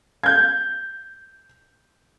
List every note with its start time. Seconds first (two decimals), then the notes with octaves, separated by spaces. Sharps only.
0.24 G6 G#6